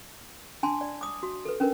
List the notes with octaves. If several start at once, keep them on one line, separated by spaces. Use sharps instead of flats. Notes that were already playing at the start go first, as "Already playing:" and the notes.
D4 G#5 A5 C6
D5
D6 D#6
F#4
A4 B4
C#4 D4 A#4 B4